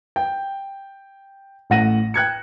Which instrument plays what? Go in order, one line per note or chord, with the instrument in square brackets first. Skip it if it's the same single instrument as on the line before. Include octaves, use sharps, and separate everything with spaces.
[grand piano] G5
A1 A2 F#5 A#6 D#7
G5 F#6 G#6 C#7